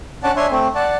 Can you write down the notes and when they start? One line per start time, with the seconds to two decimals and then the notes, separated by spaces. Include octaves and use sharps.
0.23 C#4 D4 D5 F#5 A5
0.36 D4 C#5 E5 G#5 C6
0.51 A3 C4
0.75 D5 F#5 A5